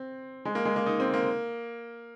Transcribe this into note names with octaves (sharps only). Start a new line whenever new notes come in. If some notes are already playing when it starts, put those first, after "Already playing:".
Already playing: C4
G#3
A#3
G#3
A#3
D#4
C4
A#3